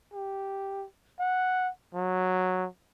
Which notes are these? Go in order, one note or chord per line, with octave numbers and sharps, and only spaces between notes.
G4
F#5
F#3